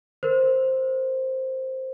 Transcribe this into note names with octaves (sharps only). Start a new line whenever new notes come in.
A#4 C5